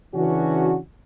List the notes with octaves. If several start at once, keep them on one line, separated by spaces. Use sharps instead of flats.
C#3 E3 C#4 D4 F#4